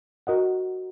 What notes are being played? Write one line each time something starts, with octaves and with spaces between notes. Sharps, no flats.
F#4 A#4 D#5 F#5